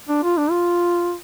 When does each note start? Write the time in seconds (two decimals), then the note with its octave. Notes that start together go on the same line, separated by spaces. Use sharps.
0.09 D4
0.23 F4
0.37 D4
0.51 F4